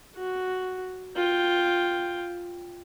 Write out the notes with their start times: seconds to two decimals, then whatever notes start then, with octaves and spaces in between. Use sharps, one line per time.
0.16 F#4
1.16 F4 G5